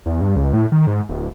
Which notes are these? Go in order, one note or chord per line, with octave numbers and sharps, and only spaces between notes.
E2
G2
C#2
A2
D#3
G#2
D1